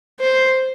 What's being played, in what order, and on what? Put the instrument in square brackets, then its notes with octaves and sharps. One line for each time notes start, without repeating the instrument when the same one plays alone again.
[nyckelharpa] C5